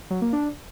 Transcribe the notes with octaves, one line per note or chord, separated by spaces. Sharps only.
F#3
A#3
D4